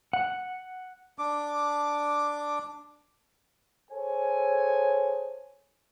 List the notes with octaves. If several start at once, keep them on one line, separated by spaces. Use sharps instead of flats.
F#5
D4 D6
G#4 A4 C5 C#5 G#5